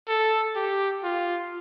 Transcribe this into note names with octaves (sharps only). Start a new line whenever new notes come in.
A4
G4
F4